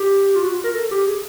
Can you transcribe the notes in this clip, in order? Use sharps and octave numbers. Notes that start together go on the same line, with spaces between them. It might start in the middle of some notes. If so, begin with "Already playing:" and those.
Already playing: G4
F4
F#4
F4
A#4
A4
G4
G#4